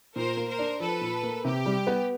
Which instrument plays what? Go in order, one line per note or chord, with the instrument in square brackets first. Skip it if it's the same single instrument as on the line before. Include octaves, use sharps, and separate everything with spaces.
[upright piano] A#2 [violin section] A#4 C5
[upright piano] A#3
[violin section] A#4 C5
[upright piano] D4
[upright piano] F3 [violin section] A4 B4
[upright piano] A#2
A#3
[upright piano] C3 [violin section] G4
[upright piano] G3
B3